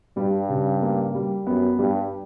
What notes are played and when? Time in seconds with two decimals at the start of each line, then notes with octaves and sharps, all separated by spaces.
0.17 G2 G3
0.49 C#3
0.82 A#3
1.15 G3
1.47 F#2 B3
1.79 G2 G3